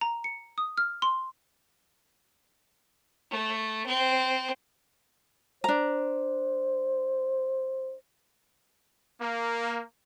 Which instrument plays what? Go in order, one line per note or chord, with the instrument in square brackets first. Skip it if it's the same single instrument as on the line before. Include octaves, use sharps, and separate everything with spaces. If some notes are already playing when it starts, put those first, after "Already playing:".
[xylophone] A#5
C#7
D#6
F6
C6
[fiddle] A3
C4
[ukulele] D4 A#5 [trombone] C5
[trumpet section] A#3